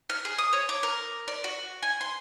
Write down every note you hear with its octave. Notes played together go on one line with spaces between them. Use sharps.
F6
G#4
D#6
C#5
D6
A#4
D5
F#4
G#5
C6